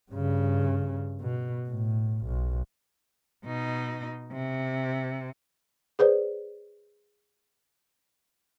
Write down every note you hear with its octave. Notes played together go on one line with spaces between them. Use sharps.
G2 C#3
B2
A2
B1
B2 D#4
C3
G#4 B4 C5 D5